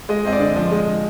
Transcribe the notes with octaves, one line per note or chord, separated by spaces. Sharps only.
G#3 D#5
C4 D#5
D5
D3
F3 D#5
G#3